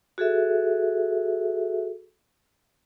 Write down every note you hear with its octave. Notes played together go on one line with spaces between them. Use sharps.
F#4 G#4 A4 E5